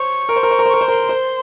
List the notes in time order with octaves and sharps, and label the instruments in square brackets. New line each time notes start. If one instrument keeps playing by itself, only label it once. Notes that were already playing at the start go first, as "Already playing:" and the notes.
Already playing: [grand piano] C5 C#5 [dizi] C#6
[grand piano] A#4
C5
A#4
C5
A#4
C5
[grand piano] A#4 [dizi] C#6
[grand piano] C5
[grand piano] A#4 [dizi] C6
[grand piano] C5